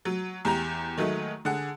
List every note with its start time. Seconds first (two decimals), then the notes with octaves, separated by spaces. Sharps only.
0.05 F#3
0.45 E2 G4 A#5
0.97 D#3 F#3 G#3 A3
1.45 D3 G#4 F#5